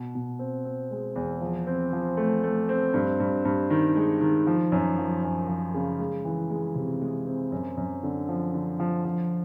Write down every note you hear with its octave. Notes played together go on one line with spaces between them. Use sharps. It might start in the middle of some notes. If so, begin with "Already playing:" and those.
Already playing: B2
B2
C4
C4
G#3
E2
F3
C4
F3
A3
A3
C4
G2
G2
G2
D#3
G#3
D#3
F3
F#2
F3
F#2
F3
C#3
G#3
E3
G#3
C3
G#3
C4
F#2
F#2
D3
F3
D3
F3
F3